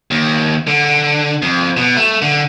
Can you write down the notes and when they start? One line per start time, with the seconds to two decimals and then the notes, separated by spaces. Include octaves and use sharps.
0.11 D#2
0.67 D3
1.42 F2
1.77 B2
1.97 A3
2.22 D3